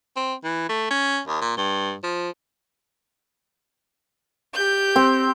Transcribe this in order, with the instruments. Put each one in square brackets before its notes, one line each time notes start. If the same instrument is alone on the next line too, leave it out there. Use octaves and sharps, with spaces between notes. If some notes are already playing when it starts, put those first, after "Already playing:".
[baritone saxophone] C4
E3
A3
C#4
D#2
A#2
G2
F3
[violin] G4 G6
[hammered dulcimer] C4